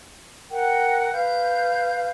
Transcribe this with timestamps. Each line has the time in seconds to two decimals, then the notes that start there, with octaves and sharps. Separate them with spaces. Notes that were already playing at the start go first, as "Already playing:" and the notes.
0.51 A#4 F#5 G5
1.12 B4 F5 G6